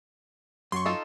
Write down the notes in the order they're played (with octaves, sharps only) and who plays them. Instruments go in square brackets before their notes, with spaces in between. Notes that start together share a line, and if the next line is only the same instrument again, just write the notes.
[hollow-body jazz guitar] F#2 [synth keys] C6 C#6
[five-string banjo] D#4 F4 A4